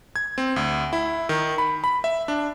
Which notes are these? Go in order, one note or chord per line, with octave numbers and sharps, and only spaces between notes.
G#6
C4
D2
E4
D#3
B5
B5
E5
D4